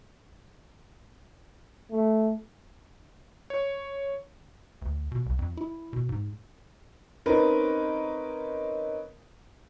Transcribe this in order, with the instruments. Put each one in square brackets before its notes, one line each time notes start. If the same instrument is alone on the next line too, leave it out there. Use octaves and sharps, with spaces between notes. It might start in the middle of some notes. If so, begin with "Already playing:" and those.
[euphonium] A3
[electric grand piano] C#5
[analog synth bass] D2
B2
C2
F2
E4
B2
G#2
[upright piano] C4 C#4 D#4 A#4 B4